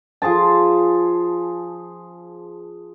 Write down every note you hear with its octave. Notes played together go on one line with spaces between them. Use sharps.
F3 G#4 C5 A5